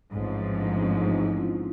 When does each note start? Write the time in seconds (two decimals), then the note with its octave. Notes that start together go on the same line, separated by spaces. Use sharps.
0.13 A1 G#2 F3 C4
0.55 D4
0.65 C#4
0.75 C4
0.85 C#4
0.97 D#4
1.09 F4
1.19 E4
1.40 F4